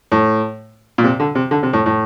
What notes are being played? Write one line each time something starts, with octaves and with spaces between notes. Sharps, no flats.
A2
A#2
C3
D3
C3
D3
C3
A2
A2